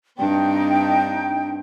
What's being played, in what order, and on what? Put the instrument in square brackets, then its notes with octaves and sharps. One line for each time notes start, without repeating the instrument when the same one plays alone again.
[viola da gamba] G2 C4 D4 [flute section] D#4 G5